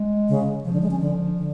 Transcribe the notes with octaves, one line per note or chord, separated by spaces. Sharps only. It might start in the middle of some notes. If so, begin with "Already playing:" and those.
Already playing: G#3
C#3
C#3 F3
D3
G#3
C#4
D3
D3